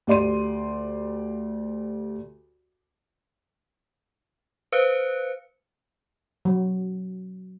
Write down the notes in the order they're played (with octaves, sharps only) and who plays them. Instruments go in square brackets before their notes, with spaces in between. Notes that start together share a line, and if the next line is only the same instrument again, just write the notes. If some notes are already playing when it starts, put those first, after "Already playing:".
[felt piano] D2 G4 D5 C6 D#7
[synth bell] B4 C5 F5 F#6 C#7
[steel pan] F#3